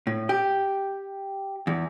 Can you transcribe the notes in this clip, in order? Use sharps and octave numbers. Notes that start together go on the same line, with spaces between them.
A2
G4
E2